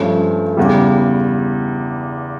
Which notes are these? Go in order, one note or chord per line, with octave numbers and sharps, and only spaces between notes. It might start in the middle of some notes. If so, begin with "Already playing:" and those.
Already playing: G2 F3 A3 C#4
E2 C#3 G3